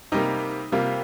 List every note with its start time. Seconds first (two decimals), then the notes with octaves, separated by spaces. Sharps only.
0.12 C3 G3 A#3 D#4
0.72 C3 G3 A#3 F4